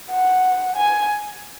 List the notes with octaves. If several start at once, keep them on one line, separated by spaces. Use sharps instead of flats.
F#5
G#5